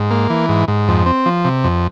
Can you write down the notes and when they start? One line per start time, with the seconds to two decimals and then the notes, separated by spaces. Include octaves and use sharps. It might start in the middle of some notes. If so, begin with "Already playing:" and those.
Already playing: G#2
0.11 A#3
0.30 E3
0.49 G#2
0.68 G#2
0.88 F2
1.06 C4
1.26 F3
1.45 C3
1.64 F2